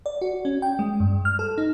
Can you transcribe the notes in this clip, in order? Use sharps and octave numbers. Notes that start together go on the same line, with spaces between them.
D5
F#4
C#4
G5
G#3
G2
F6
A4
D#4